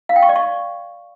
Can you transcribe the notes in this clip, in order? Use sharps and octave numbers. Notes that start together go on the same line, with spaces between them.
F5
G5
C#6
D5
C#6